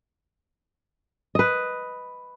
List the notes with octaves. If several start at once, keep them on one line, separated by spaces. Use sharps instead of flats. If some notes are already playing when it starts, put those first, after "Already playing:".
B4 D#5